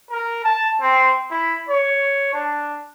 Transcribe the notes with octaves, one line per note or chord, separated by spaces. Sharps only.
A#4
A5
C4
E4
C#5
D4